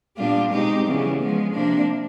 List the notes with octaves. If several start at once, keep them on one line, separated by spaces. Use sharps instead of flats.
A#2 G3 B3 D4 F4
B2 G#3 C4 D#4 G4
C#3 E3 G3 B3
F3 G#3 B3
C3 F3 A#3 D4